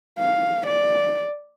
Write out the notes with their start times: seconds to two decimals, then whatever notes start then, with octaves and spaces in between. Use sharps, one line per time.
0.19 F5
0.67 D5